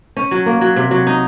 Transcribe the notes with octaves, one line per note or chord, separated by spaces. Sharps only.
C#4
F#3
A#3
F#3
C3
F#3
D#4